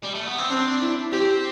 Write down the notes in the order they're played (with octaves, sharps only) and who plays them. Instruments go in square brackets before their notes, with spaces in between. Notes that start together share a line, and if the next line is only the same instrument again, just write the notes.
[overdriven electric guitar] G3
A3
B3
C4
[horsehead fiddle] C4 [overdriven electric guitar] D4
[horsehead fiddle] E4
[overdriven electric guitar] C4 [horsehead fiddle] G4